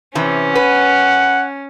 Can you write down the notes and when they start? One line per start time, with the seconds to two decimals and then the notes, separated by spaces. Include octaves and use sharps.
0.15 C3 E3 C#4
0.56 B4 F#5